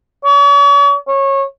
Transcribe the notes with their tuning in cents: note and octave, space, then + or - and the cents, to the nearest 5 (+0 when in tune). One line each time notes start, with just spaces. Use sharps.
C#5 +40
C#5 -20